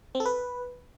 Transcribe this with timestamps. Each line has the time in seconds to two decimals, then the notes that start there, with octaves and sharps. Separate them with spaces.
0.15 C4
0.20 A4
0.25 B4